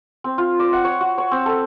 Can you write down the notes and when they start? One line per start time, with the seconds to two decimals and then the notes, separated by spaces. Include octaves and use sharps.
0.24 C4
0.38 F4
0.59 D5
0.73 F#5
0.84 C#5
1.01 F#4
1.18 C#5
1.31 C4
1.46 A4